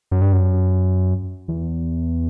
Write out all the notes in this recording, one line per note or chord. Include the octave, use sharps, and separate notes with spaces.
F#2
G2
F#2
E2